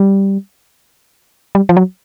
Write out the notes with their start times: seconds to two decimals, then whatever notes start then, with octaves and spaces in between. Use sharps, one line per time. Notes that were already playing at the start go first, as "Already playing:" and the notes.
Already playing: G3
1.55 G3
1.69 F3
1.77 F#3